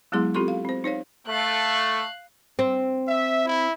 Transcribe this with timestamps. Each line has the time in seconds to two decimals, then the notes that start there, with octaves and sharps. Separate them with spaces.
0.12 F#3 G#3 B3 E4 G#4 C6
0.34 C4 F4 G4 A4 C6 C#6
0.48 F5
0.65 C4 C5
0.84 D#4 C5 C#5 F5
1.28 A3 F5 F#6
2.59 C4
3.08 E5
3.44 E4